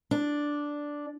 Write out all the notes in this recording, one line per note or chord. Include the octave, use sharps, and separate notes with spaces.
D4